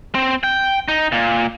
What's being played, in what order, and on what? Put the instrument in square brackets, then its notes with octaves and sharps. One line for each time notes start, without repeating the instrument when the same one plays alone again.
[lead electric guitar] C4
G5
D#4
A#2